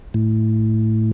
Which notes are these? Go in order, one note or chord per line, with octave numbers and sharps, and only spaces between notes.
A2